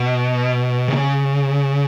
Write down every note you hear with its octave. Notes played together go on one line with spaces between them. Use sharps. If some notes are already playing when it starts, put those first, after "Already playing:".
Already playing: B2
C#3